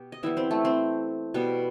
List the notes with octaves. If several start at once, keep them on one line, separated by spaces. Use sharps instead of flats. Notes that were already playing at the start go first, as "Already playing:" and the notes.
Already playing: B2 G4 G5
D#5
E3 G3 B3 E4 E5
C4 C5
A3 A4
C4 C5
B2 G3 B3